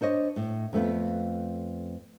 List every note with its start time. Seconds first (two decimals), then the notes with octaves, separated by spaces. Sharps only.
0.01 D4 C5 C#5 D#5
0.36 A2
0.73 F2 A3 B3 F4